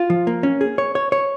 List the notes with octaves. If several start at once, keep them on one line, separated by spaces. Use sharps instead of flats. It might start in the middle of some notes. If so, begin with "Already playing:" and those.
Already playing: F4
F3
A#3
C#4
G#4
C#5
C#5
C#5